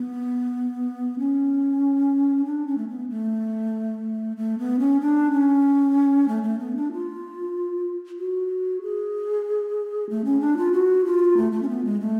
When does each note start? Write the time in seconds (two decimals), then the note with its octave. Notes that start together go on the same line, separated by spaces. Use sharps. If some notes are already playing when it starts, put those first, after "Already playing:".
Already playing: B3
1.19 C#4
2.45 D4
2.67 C#4
2.78 A3
2.89 B3
3.09 A3
4.37 A3
4.59 B3
4.79 C#4
5.01 D4
5.32 C#4
6.28 A3
6.43 A3
6.59 B3
6.76 D4
6.92 F4
8.19 F#4
8.82 G#4
10.09 A3
10.25 C#4
10.41 D4
10.57 F4
10.73 F#4
11.05 F4
11.37 A3
11.52 A3
11.62 C#4
11.69 B3
11.85 G#3
12.00 A3